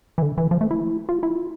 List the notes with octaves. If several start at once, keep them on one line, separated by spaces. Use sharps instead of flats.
E3
D3
E3
F3
A3
E4
F4
E4
F4